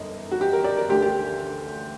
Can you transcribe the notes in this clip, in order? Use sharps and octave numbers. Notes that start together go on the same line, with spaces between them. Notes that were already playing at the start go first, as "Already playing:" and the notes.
Already playing: G1 F#2 D3 D#4
F#4
G4
A#4
D5
A#4
D2 D3 G4
G4